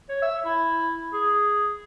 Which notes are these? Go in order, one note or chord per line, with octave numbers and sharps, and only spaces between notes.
C#5
E5
E4
G#4